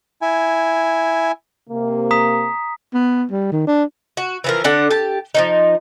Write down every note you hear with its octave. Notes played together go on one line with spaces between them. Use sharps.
E4 G#5
C3 A#3
A#5 D#6 B6
B3
G3
D#3
D4
F#4
E3 F3 A#4
D3 D4 F#5
G4 A5
F3 C#4 D#4